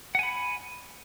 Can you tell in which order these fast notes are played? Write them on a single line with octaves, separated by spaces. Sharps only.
F#5 G#5 B5